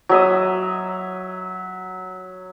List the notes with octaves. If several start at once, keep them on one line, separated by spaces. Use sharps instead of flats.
F#3 E5 D#6